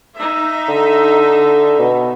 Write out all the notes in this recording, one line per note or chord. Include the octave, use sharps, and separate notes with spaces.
D#4 E5
D3
B2